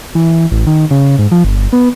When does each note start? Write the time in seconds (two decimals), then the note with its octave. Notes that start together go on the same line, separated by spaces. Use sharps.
0.15 E3
0.52 A1
0.67 D#3
0.91 C#3
1.19 G#2
1.31 F3
1.44 G1
1.73 B3